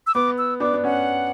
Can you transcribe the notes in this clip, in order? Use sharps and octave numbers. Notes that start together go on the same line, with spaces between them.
E6
B3 D6
E6
B3 D4 D6
D4
C#4 F#5